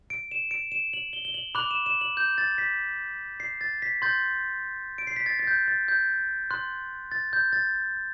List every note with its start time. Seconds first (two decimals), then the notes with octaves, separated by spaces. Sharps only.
0.10 D7
0.31 E7
0.51 D7
0.72 E7
0.93 F#7
1.13 G7
1.25 G7
1.34 F#7
1.55 B5 D6 F#6 F#7
1.71 E7
1.86 E7
2.01 F#7
2.17 G6
2.38 A6
2.58 B6
3.40 C7
3.61 A6
3.82 B6
4.02 C6 G6 A6
4.98 D7
5.07 C7
5.16 B6
5.26 A6
5.39 A6
5.47 G6
5.68 A6
5.88 G6
6.51 C6 F#6
7.11 A6
7.33 G6
7.53 A6